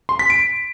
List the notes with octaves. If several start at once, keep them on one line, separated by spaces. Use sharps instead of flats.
C6
B6
D7